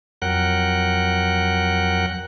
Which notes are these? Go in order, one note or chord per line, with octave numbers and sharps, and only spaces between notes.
F2 F#3 A#4 F#5 G5 F#6